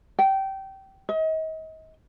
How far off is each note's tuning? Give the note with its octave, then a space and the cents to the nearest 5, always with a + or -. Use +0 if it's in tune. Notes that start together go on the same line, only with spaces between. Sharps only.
G5 -20
D#5 +35